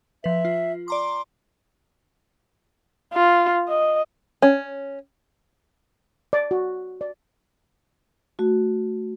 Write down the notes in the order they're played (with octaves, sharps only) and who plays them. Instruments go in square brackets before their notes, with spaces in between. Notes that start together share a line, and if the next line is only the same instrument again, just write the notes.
[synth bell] F3 B4 [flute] E5
[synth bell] F4
[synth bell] D5 A#5 D6 [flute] C6
[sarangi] F4
D#5
[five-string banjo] C#4
[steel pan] D5
F#4
D5
[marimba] A3 F#4